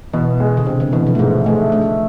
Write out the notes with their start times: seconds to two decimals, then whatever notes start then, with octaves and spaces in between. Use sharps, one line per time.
0.14 B2 E3
0.40 G#3
0.57 D3
0.66 C3 C4
0.80 D3
0.93 B2 E3
1.07 F3
1.15 A3
1.19 G#2 G#3
1.46 G#3 A3
1.72 A3 D4